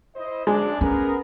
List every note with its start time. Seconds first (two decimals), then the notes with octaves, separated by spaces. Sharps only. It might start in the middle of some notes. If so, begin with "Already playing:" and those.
0.16 E4 C5 D#5
0.47 F#2 G#3 D4
0.81 B3 C#4 G#4 A#4